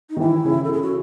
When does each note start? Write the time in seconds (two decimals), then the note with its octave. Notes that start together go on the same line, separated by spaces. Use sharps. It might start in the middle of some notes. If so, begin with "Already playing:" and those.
0.10 D#4
0.16 D#3
0.20 E3 E4
0.45 C#3
0.64 C#3 A4
0.73 G#4
0.83 F#4